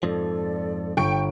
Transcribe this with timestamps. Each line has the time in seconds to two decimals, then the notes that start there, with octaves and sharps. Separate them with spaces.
0.03 F2 G#2 F3 A4 D5
0.97 G1 G5 C#6 D7